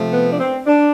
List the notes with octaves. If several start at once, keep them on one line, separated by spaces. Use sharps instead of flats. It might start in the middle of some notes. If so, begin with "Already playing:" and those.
Already playing: C3 F3 A3
B3
D4
C4
D4